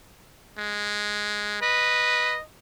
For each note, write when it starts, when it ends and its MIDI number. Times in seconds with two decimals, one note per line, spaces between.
0.58 1.58 56
1.62 2.36 71
1.62 2.42 75